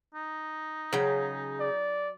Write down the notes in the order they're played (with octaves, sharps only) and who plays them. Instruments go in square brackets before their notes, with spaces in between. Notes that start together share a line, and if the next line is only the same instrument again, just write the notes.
[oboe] D#4
[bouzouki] C#3 [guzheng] F#3 G5
[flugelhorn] D5